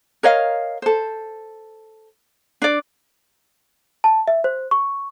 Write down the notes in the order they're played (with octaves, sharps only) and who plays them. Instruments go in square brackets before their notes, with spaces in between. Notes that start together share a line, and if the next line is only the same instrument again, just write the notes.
[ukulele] A#4 C#5 D#5 F5
A4 C5
D4 D5
[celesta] A5
E5
C5
C#6